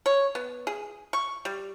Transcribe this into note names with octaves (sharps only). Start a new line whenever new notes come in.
C#5
B3
G#4
C#6
G3